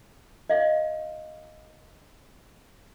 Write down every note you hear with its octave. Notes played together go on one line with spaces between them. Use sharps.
D#5 F5